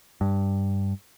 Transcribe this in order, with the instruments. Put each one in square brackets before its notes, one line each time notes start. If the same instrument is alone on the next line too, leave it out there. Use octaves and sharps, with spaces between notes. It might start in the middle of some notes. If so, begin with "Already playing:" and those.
[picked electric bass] G2